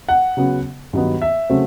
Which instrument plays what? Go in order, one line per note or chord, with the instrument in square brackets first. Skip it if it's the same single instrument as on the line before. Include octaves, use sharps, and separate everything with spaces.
[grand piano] F#5
C#3 F#3 B3
G2 D#3 F#3 B3
E5
C#3 F#3 A3 C4